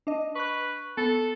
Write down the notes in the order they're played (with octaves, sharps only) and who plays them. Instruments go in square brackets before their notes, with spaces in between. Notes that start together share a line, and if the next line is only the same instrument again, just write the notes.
[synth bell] D4 D#5
[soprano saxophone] B4 [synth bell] C#6 F#6
[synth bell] B3 [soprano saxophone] A4